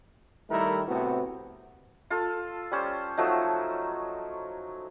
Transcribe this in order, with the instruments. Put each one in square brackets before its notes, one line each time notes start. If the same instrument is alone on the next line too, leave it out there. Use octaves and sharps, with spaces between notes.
[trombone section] D#3 G3 A3 E4 A#4
A2 C3 B3 C4 F#4
[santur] F4 A4
G3 C#4 C5
F3 F#3 A3 D#4